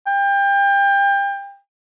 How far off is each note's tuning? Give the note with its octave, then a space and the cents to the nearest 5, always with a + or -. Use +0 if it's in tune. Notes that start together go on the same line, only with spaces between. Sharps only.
G5 +30